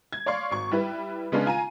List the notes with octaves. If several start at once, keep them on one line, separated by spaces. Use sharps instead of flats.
G#6
C#5 D5 F5 C6 C#6
G#1 C#6
G3 E4 B4
C#3 G#3 B3 C#4 D4
F4 G#5 A#5 D#7